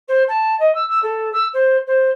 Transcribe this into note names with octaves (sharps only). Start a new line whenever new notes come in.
C5
A5
D#5
E6
E6
A4
E6
C5
C5